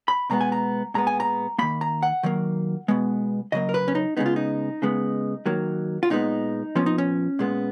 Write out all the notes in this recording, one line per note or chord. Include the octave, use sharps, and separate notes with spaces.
B5
B2 G#3 B3 A#5
G#5
A#5
A#2 G#3 B3 A#5
G#5
A#5
D#3 A#3 B5
A#5
F#5
D#3 F#3 A#3
B2 G#3 B3
C#3 F#3 A#3 D#5
A#4
B4
C#4
D#4
C#3 G#3 B3 D#4
F4
D#4
C#3 G#3 B3
D#3 F#3 A#3
F4
A#2 G#3 B3 D#4
A#2 F3 B3 C#4
D#4
C#4
A#2 G#3 B3